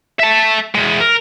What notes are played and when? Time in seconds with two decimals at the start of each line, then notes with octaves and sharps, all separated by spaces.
0.20 E5 A5
0.75 E2 G#3
1.00 A#4